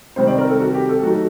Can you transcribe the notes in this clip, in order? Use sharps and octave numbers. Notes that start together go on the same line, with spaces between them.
C3 D#3 G3 C4 C5
D5
A#4
A4
F#4
G4
A4
F#3 A3 D#4 F#4